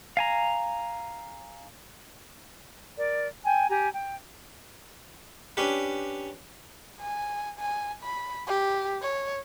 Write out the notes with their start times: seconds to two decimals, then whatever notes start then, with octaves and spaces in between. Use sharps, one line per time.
0.17 F5 G#5 A#5
2.96 A#4 D5
3.44 G5 G#5
3.69 G4 G#5 A#5
3.92 G5
5.57 C#4 D4 G4 B4
7.00 G#5
7.59 G#5
8.03 B5
8.47 G4
9.02 C#5